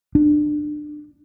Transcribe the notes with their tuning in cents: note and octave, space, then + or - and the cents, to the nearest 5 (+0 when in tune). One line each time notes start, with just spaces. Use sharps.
D4 +25